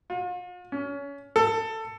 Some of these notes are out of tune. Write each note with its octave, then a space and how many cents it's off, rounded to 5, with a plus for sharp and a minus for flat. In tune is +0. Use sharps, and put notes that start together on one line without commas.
F4 +40
C#4 +25
A4 +15